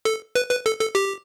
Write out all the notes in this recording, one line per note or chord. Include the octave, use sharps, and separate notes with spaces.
A4
B4
B4
A4
A4
G4